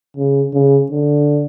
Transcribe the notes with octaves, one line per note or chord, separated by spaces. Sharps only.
C#3
C#3
D3